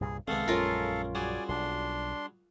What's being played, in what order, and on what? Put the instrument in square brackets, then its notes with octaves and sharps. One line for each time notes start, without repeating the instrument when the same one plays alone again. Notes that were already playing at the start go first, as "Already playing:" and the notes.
[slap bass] C2 G2 A#2 [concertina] G#4
[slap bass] C2 D#3 C4 [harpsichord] G#3 A3 B3 [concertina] A4 F5
[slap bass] A#1 F#2 [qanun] C#4 F4 A#4
[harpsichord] G3 F#4 G#4 [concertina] D5 G#5
[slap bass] B1 [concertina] D4 C6